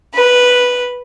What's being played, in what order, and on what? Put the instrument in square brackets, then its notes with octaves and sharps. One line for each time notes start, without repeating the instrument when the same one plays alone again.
[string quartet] B4